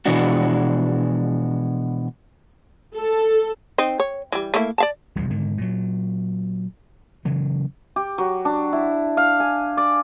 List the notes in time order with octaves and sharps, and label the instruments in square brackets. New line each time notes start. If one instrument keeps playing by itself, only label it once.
[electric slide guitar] B2 E3 F3 G#3 D4 F#4
[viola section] A4
[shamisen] C4 D#4
C#5
E3 G3
A3 A#3 E4
D5 F5 A5
[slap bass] E1 C2 F2 F3
G#2 D3 D#3
A#2 F#3
C#3 E3 F#3
[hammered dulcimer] G4
F#3
D4
E4
F5
G#5
D5